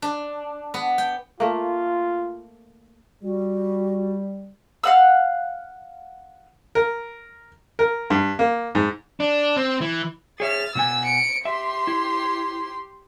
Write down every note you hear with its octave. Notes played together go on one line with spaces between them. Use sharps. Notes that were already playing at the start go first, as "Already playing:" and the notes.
D4
B3
G5
A3 A#3 F4
G3 F#4
F5 F#5 E6
A#4
A#4
G2
A#3
G#2
D4
C4
E3
G#4 C#5 E5 F6 A6
B2 B3 G#5 E6
C#7 D7
G4 E5 C6
E4